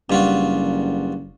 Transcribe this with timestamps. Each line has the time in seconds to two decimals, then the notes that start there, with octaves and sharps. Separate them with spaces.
0.10 F#1 G2 F4 F#4